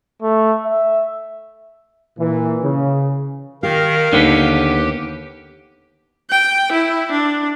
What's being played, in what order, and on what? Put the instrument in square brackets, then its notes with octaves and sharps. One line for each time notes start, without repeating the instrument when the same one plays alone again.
[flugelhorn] A3
E5
[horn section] A#2 E3
C#3
[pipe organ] D#3 A#4 [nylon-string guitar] G4 [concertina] F5
[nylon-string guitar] D#2 D#4 [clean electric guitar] D3 B3 [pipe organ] G4
[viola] G5
E4
D4